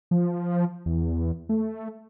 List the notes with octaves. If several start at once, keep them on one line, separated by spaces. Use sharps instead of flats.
F3
E2
A3